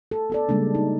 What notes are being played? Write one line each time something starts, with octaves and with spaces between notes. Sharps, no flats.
A4
B3 A4 D5
C#3 G3 G#3 A#3 D4
D#4